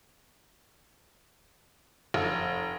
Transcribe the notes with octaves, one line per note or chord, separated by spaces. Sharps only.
F1